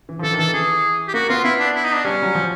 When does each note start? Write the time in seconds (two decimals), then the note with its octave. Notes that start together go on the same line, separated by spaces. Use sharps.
0.09 E3
0.19 F3
0.23 E3 A4
0.34 D#3
0.39 E3 A4
0.54 E3 G#4
1.08 G4
1.14 A#3 F#4
1.29 B3 F4
1.44 B3 E4
1.59 D4
1.75 E4
1.85 D#4
1.95 D4
2.04 G3 C#4
2.22 F#3
2.35 F3